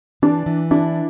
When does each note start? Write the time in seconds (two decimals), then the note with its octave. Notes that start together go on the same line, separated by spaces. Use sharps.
0.22 E3 D4
0.46 E3
0.71 D4 E4